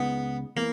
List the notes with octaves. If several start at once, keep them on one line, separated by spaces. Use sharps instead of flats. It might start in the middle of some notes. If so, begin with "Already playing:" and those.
Already playing: C#2 C#3 G#3 B3 D#4
E3 A#3 B3